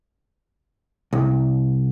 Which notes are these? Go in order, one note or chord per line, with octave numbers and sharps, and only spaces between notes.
C2